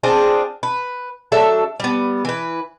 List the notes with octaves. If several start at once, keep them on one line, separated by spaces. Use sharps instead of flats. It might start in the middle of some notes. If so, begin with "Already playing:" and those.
C4 D4 F4 G#4
B4
F#3 D4 A4 E5
G3 B3
E3 B4